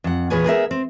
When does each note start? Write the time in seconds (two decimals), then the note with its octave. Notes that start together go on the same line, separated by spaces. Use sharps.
0.04 F2 F#5
0.30 E2 A#2 G#4 B4 C#5 G#5
0.44 B3 G#4 A#4 E5
0.71 C4